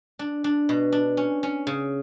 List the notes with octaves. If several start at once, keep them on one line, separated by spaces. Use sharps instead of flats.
D4
D4
B2
D4
C#4
C#4
C#3